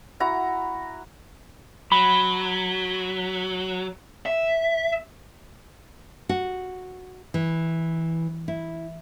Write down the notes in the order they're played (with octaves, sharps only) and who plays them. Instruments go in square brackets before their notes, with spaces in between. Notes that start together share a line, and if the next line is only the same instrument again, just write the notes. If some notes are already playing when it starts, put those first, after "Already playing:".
[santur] E4 F#4 A#5
[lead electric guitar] F#3 [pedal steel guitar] B5
[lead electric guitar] E5
[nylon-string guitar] F#4
E3
E4